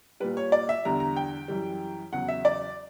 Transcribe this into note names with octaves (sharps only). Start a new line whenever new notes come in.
A#2 G3 B4
C#5
D5
E5
E2 D3 G3 A#5
A#5
G5
F#2 E3 G3
E2 C#3 F#3 F#5
E5
D5